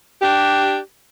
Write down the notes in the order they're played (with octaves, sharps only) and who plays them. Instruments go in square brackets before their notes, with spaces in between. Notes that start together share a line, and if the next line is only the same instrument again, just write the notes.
[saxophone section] D4 G4